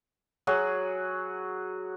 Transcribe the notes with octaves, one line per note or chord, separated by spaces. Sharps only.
F#3 F#4 G#4